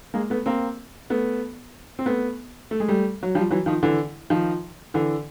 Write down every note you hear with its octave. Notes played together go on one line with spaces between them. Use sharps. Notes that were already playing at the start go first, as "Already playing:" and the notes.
G#3 A#3
A3 B3
A#3 C4
A3 B3
C4
A3 B3
A3
G#3
G3 A3
F#3
F3 G3
E3 F#3
D#3 F3
D3 E3
D#3 F3
D3 E3